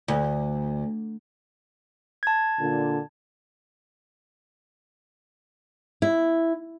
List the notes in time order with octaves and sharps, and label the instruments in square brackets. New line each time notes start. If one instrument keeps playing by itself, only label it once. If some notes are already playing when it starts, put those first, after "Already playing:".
[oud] D2
[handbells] A5 G#6
[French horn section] A#2 D3
[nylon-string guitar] E4